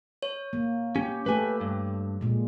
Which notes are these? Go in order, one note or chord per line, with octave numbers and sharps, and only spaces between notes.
C#5
A#3
C#4 G4
A3 G4 A4 B4 G#5
G2
A#2 G#3